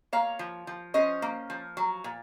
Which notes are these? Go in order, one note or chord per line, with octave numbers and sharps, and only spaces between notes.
A#3 C#5 F5
F3
F3
C#4 C5 D#5
A#3
F3
F#3
A#2